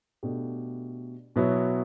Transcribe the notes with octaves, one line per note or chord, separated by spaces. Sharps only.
B2 A3 D4 G4
B2 F#3 B3 E4